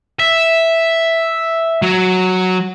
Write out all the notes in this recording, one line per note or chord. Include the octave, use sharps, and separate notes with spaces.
E5
F#3